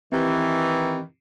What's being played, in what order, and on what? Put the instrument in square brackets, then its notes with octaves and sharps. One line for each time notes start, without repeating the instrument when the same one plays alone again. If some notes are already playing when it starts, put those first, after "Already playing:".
[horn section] D#3 E3 [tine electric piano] C4 G4